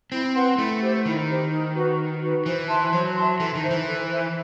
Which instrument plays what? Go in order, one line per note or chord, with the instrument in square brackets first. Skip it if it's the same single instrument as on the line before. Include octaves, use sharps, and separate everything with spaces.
[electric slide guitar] C4 [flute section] E4
[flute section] B4 F#5 C6
[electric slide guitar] A3 [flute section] E4
[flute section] G4 C5
[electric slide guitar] D#3 [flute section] E4
[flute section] G4 C5
D#4
F#4 B4
D#4
F#4 B4
[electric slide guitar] E3 [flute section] C5
[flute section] E5 A5 C6
[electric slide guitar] F#3 [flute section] C5
[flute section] E5 A5 C6
[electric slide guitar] E3 [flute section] A4
[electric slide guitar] D#3
[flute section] C5 E5
[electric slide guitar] E3
[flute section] A4
C5 E5